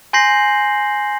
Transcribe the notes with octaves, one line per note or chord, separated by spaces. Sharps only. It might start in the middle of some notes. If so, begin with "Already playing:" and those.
G#5 C6 G6 A#6 C7 F#7